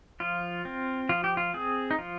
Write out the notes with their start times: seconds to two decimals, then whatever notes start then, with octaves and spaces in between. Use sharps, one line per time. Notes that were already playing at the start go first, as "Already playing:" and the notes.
0.20 F3 F4
0.65 C4
1.09 F3 F4
1.24 G4
1.37 F4
1.54 C4 G#4
1.91 D#4
1.99 F3 F4